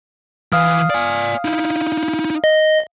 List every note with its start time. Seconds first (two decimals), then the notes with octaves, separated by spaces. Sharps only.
0.52 E3 F5 D#6 F6
0.90 D5 G#5
1.45 D#4 E4
2.44 D#5